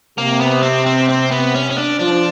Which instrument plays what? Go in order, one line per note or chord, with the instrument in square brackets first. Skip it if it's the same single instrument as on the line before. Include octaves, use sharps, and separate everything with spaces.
[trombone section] C3 [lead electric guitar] A#3
[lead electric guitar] B3
C4
C4
C4
B3
C#4
C#4
D4
[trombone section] F3 [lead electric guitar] D4